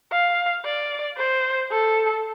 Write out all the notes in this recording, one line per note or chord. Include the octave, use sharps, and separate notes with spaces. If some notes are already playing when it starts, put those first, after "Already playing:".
F5
D5
C5
A4